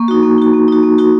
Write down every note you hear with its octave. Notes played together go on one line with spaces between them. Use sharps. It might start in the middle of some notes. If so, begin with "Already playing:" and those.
Already playing: A#3 C#6
D#4 F#4
A#3
D#4 F#4
A#3
D#4 F#4
A#3
D#4 F#4